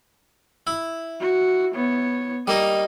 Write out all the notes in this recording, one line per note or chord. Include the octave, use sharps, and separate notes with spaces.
E4
F#4
B3 C#5
G3 A#3 D#4 D#5